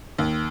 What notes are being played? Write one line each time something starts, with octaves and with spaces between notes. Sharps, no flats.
D#2